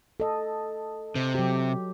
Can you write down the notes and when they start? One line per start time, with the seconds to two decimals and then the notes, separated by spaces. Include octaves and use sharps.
0.20 A4 D#5
1.15 C3
1.35 F#3 G4